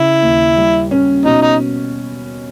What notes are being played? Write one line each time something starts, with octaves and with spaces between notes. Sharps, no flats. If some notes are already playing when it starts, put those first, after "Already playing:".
Already playing: C#3 E4
D#2
G3
C#4
B2 D#4
D#4